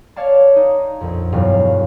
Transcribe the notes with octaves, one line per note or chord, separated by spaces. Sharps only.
C#5 D5 F5 A5
D#4
A#1 F2
E1 G2 F#3 F5